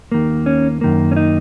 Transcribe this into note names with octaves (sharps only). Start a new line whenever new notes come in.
D#2 D#3 A#3
C#4
F#2 D#3 A#3
C#4
D#4